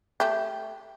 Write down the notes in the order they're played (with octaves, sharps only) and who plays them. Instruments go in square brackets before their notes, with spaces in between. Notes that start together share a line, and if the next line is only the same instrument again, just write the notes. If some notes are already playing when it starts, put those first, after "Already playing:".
[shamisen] A3 G4